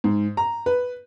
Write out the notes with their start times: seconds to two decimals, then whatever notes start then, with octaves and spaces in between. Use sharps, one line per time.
0.04 G#2
0.37 A#5
0.66 B4